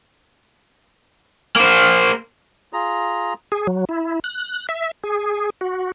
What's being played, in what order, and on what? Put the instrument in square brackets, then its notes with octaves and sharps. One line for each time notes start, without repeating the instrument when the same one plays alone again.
[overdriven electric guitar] A#3 C5
[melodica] F4 G#4 A#5
[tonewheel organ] G#4
F#3
E4
F#6
E5
G#4
F#4